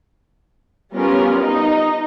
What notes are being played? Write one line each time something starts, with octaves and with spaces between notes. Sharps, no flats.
G3 B3 C#4 F4 A#4
D#4